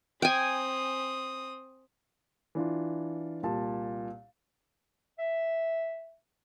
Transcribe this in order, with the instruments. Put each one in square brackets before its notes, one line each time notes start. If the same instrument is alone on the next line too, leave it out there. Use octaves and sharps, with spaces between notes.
[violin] C4 D#6 [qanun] G5 G#5
[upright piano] E3 D4 F4
C2 A#2 A5
[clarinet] E5